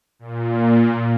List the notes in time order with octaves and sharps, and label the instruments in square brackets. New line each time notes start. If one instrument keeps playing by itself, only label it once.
[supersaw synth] A#2